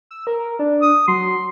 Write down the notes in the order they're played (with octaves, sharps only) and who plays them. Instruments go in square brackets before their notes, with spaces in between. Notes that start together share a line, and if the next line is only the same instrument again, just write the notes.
[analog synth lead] E6
A#4
D4
[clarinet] D#6
[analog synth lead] F#3 [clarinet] C6